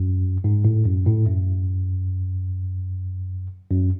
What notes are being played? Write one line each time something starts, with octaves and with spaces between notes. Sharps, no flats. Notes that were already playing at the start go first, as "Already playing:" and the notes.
Already playing: F#2
G#2
A2
F#2
A2
F#2
F#2